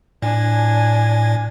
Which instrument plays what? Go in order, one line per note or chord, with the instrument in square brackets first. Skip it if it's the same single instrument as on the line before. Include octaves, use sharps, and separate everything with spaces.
[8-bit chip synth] A2 [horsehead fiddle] D4 G#5